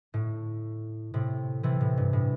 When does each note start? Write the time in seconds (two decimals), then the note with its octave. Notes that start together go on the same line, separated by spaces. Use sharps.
0.14 A2
1.14 A2 C3
1.63 C3 E3
1.81 A2
1.97 G2
2.13 A2